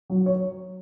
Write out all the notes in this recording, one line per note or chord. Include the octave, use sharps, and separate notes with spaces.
F#3
C#5